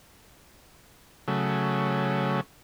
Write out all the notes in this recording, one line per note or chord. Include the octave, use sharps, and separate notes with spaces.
C#3 F#3 A3